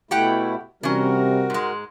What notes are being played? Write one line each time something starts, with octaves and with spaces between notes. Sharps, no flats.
B2 A3 E4 G4 F#5 G5
C3 E3 G3 C#4 F#4 A#4
G#2 G#3